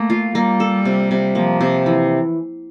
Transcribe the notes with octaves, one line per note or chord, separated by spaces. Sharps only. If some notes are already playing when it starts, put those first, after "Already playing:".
Already playing: A3 A#3
F4
G3 A#3
A4
C3
C3
F3 A#3
C3
E3